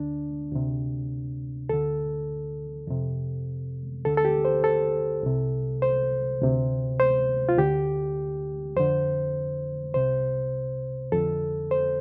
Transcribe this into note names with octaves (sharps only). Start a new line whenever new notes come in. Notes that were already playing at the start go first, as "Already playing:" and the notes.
Already playing: D2 D3 D4
D2 C3
D2 D3 A4
F2 C3
D2 D3 A4
A4
G4
C5
A4
C2 C3
C5
D2 C3
C5
F4
D2 D3 G4
F2 D3 C5
C2 C3 C5
F2 D3 A4
C5